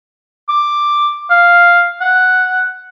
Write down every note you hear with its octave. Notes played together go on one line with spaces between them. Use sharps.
D6
F5
F#5